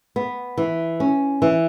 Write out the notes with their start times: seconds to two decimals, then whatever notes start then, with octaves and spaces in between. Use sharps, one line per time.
0.16 B3
0.57 E3
1.00 C#4
1.42 E3